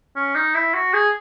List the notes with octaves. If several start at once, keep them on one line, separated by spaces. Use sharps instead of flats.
C#4
D#4
E4
F#4
G#4